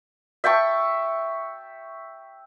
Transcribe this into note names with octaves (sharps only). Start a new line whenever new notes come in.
E5 G5 A5 C#6